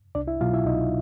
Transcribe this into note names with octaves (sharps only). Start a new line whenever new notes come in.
C2 D4 D5
E4 E5
B2 F#3 F4 F5
E4 E5
C2 D#4 D#5